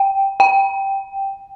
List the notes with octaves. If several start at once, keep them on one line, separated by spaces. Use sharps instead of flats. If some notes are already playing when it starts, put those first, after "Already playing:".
Already playing: G5
G5